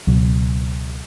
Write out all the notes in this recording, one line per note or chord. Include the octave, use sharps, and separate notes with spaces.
C#2 B2 F#3